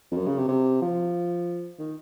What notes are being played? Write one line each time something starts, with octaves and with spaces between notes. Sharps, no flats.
F2
F#2
C#3
C3
C3
F3
D#3